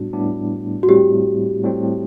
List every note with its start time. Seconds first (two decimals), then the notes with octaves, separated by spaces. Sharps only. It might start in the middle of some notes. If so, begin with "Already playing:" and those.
Already playing: A2 G3 B3 D4 F#4
0.13 A2 G3 B3 D4
0.83 F#4
0.88 A2 G3 C4 G4
1.63 A2 G3 C4